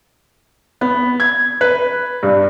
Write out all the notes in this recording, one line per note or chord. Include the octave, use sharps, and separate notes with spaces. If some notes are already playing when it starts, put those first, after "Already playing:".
B3
G#6
B4
G2